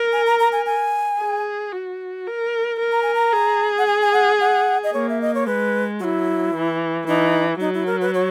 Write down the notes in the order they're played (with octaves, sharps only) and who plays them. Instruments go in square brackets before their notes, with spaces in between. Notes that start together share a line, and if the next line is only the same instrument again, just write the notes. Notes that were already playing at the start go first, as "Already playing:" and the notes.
Already playing: [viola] A#4
[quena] G#5
A#5
A#5
G#5
G#5
[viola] G#4
F#4
A#4
A#4
[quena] A#5
G#5
A#5
[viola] G#4
[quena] F#5
G#5
G#5
F#5
F#5
D#5
[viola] A#3 [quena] C#5
[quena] E5
D#5
C#5
[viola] G#3 [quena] B4
[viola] F#3 [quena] E4 F#4
[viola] E3
[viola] E3 [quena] D#4
[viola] F#3 [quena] D#4
[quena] E4
A#4
B4
C#5